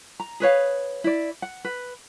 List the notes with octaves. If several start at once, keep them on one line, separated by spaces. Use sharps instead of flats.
A#5
G#4 B4 C#5 F5
E4 D5
F#5
B4